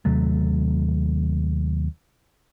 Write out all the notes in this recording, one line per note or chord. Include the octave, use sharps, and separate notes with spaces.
D#2 C3 F#3 A3